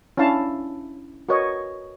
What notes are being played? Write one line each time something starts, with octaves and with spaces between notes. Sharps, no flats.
C#4 D4 E4 F5 A5
F#4 A#4 B4 C#5 D#5